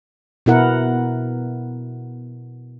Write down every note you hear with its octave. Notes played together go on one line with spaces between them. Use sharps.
B2 B3 E4 A#4 F#5